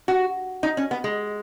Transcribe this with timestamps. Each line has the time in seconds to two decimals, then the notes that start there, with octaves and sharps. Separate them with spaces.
0.08 F#4
0.63 D#4
0.77 C#4
0.91 B3
1.04 G#3